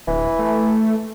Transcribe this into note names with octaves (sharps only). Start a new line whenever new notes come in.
D1 E3
A3